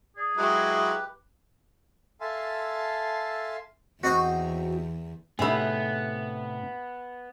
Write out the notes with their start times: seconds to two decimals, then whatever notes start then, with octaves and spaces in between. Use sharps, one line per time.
0.17 G#4 D5
0.37 F#3 G#3 E4 G4 B4
2.21 A4 E5 F5 G#5 A5 C6
4.03 E2 C4 D#4 F#4 C5
5.39 A2 C3 B3 D#4 E4 G#4